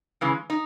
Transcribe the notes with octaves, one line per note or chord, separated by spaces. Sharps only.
C#3 E3 G#3
D#4